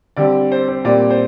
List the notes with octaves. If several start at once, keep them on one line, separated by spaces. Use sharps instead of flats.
D3 G3 C4 D5
C5
C5
A#2 G3 C4 D5
G5
C5